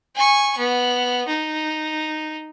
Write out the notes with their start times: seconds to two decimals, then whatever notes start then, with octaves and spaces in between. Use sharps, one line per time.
0.15 G#5 C#6
0.58 B3
1.27 D#4